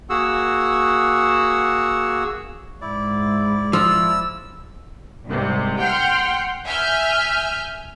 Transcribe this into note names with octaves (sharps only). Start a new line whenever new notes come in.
A#3 F#4 G#4 F#5 E6
G#2 E4 D5
F3 E6
C2 G#2 C3
F#5 G5 C6 F6
E5 G#5 F6 G6